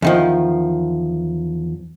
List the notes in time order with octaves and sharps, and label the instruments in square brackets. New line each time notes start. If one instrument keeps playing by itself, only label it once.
[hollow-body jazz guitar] E2 D#3 F3